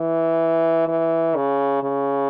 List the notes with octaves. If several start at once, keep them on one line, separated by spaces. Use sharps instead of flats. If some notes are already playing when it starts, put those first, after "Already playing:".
Already playing: E3
E3
C#3
C#3